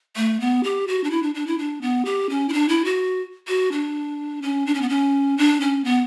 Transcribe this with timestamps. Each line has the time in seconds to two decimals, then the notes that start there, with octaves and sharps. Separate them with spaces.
0.16 A3
0.40 B3
0.64 G4
0.88 F#4
1.04 D4
1.11 E4
1.22 D4
1.34 D4
1.47 E4
1.58 D4
1.81 B3
2.05 G4
2.30 C#4
2.49 E4
2.53 D4
2.69 E4
2.85 F#4
3.48 F#4
3.72 D4
4.42 C#4
4.66 D4
4.74 C#4
4.82 B3
4.89 C#4
5.37 D4
5.61 C#4
5.84 B3